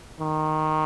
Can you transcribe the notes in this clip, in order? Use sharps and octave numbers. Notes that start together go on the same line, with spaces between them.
D#3